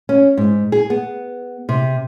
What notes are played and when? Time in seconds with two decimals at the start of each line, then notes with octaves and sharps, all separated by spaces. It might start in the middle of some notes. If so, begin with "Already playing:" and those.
0.09 C#4
0.37 G#2
0.72 G#4
0.90 B3
1.69 C3